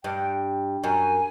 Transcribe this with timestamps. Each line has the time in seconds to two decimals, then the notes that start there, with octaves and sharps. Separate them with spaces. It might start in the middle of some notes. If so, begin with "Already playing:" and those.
0.04 G2 G5
0.84 F#2 G#5